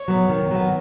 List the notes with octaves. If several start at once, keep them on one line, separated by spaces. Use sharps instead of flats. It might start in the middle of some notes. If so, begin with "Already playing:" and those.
Already playing: C#5
F#3 B3
D#3
F#3 B3